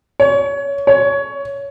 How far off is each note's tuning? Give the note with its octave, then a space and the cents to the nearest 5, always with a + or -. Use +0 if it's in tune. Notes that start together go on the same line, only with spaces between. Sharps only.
C#5 +20
C#5 +15